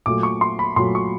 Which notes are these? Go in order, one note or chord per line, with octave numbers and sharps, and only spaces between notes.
A#2 F#3 A3 D6
C#6
C6
B5
A#2 F#3 A3 C6
C#6